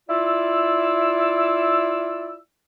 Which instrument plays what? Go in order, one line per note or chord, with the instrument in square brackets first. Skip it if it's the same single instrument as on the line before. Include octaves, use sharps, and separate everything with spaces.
[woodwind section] E4 F4 D5 E6